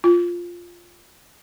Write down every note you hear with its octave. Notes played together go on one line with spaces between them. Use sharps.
F4